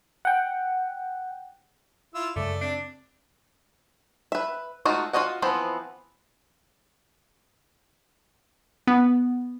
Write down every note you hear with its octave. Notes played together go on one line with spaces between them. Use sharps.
F#5 G5
E4 F4 E6
F#2 C#3 G#3 A3 D5
C4 D4
B4 E5
G#3 A3 D#4 F4 F#4
F4 F#4 C#5 D#5 F#5
E3 F3 B3 C4
B3